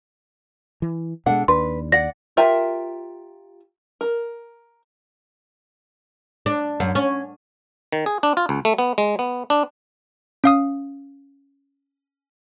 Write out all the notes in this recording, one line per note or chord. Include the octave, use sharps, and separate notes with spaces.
E3
B2 G#3 D4 A4 F#5
D#2 D4 B4 C6
D5 F#5 A#6
F4 G4 A#4 E5
A#4
D4
F#2
C#4
D#3
G#4
D4
F4
C#2
A3
B3
G#3
B3
D4
C#4 F5 D#6